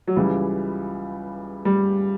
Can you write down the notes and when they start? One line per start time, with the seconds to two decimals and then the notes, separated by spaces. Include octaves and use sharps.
0.07 F#3
0.16 C#2 C#3 E3 G3
1.65 G3